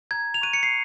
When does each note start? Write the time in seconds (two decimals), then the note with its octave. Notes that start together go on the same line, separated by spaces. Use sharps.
0.11 A#5 G#6
0.34 F7
0.41 C#6 F#6 D#7
0.53 C#7
0.63 C7